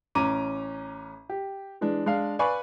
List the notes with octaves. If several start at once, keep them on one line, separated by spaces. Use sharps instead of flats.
A1 C#4 A#5 D6 D#7
G4
E3 G#3 D4
G#3 D4 F5
B4 D5 F5 G#5 B5 C#6